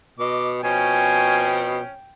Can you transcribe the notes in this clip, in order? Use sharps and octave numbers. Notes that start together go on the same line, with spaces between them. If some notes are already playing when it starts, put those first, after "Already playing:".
B2 D#5 D6
B2 F3 C4 C#4 G5 G#5